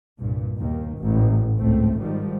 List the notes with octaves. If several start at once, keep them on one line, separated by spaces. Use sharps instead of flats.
C2 G2 A#2
D#2 B2 D#3
A1 G#2
G#1 C#2 A2 A3 C4
G#2 D#3 F3 G3